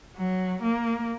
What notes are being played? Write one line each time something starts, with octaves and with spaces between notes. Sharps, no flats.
F#3
A#3